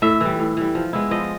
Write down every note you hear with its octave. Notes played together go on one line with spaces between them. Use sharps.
A2 E5
E3 G3
A2
E3 G3
F3
G#3 B3 E4
F3 D#5